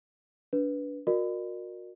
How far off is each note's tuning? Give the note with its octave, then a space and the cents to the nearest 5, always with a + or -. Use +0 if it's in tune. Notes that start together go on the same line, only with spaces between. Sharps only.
D4 -25 B4 -5
F#4 -30 A#4 +0 D5 +45